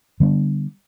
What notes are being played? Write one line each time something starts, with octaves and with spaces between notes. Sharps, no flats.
D3 G3 B3 D4